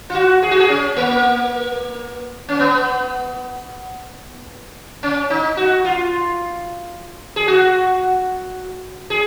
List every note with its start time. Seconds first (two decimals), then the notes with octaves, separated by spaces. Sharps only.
0.10 F4
0.15 F#4
0.42 G#4
0.51 F#4
0.60 G#4
0.69 C#4
0.97 A#3
2.49 C#4
2.59 B3
5.03 C#4
5.30 D#4
5.57 F#4
5.84 F4
7.36 G#4
7.48 F#4
9.10 G#4